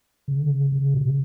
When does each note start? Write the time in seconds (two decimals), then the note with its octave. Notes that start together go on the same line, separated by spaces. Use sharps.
0.28 C#3
0.39 D3
0.50 C#3
0.72 C#3
0.94 B2
1.06 C#3